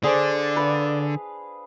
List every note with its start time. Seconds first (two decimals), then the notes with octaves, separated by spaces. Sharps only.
0.03 D3 D4 G#4 C5 D5
0.56 B4 F5